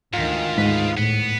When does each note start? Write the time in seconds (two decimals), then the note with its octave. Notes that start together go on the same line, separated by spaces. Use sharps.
0.13 D2 G#2 D#3 F4
0.58 G#2 B4 D#5
0.97 A2 B3